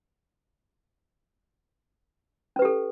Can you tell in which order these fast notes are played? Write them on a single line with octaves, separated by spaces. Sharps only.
C#4 B4 G4 A4